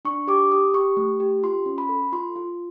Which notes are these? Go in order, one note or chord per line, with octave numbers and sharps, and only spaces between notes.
D4 C#6
G4 D6
G4 D#6
G4 C#6
A3
G4
F4 C6
C#4
B5
A4
F4 C6
F4